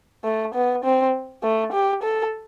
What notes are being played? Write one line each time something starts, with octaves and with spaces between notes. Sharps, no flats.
A3
B3
C4
A3
G4
A4